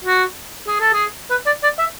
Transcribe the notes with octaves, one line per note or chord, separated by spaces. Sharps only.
F#4
G#4
A4
G#4
B4
D5
D5
E5